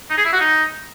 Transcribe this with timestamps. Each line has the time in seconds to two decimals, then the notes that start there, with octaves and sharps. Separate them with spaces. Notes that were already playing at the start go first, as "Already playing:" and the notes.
0.10 D#4
0.18 G#4
0.25 E4
0.33 F#4
0.40 D#4